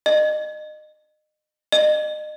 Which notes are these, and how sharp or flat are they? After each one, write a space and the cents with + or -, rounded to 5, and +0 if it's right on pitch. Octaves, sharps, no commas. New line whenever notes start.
D#5 -30
D#5 -35